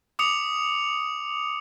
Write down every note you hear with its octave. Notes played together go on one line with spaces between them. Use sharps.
D6 D#6 C#7 F7